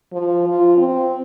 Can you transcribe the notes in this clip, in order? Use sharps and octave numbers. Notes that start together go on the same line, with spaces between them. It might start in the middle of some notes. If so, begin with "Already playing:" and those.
F3
F4
C4